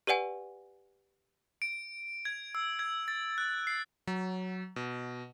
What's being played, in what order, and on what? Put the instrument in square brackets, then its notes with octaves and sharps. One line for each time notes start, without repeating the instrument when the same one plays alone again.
[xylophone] G4 B4 D5 F#5 G#5
[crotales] D7
G#6
E6
G#6
A6
F#6
C7
[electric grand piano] F#3
B2